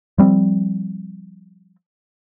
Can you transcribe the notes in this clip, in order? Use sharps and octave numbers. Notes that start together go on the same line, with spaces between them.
F3 G3 C4